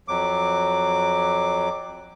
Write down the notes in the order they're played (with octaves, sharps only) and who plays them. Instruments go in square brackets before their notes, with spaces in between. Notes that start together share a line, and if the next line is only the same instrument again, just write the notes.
[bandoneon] F2 F#3 D6